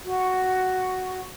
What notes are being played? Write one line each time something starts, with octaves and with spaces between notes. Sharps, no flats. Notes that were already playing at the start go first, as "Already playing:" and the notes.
F#4